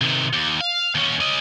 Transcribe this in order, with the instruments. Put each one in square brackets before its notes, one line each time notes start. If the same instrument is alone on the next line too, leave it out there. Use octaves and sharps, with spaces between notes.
[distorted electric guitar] C3 D#3
D#2
F5
D#2 C#4
C#4 D#5